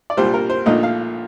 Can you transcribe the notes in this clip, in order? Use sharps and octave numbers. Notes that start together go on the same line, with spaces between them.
D5
C2 A#2 G3 C5
A#4
C5
A#1 A#2 A3 D#4 D#5
F5